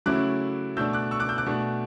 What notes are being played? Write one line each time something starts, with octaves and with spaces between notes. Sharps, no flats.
C#3 F#3 A3 C#4 E4 D6 F#6
B2 A3 D4 E6 G6
D6 F#6
C#6 E6
D6 F#6
E6 G6
D6 F#6
B2 A3 D4